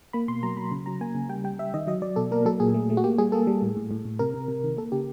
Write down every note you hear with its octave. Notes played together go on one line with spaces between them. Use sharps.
A#3 B5
B2 C6
F#3 A#5
F#3 B5
C#3
F#3 A#5
A#3 G#5
C#3
G3 G5
G3 G5
G3 E5
D#3 D#5
F#3 D#5
F#3 D5
B2 A4
A#3 A#4
F#3 A4
A#2 G#4
A3
A3
F#4
A#3 G4
G3 G#4
A#3 A4
G3
A2
A2
A2
A2
C3 A#4
C3
C3
D#3
A#3 A4
C#3 G4